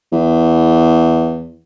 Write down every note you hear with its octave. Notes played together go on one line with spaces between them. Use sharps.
E2